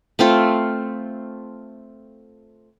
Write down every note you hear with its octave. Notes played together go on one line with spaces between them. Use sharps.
A3 C4 F4